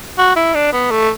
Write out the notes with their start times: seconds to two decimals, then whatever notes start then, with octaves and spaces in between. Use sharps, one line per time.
0.18 F#4
0.36 E4
0.55 D4
0.73 B3
0.91 A3